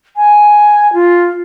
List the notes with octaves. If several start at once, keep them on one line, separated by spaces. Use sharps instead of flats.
G#5
F4